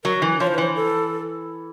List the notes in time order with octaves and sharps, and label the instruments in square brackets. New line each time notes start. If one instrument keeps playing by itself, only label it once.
[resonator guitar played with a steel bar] F#3 [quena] A#4
[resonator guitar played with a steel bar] E3
[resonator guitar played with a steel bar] F3 [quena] C#5
[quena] C5
B4
[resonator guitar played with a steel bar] E3 [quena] C5
[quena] A4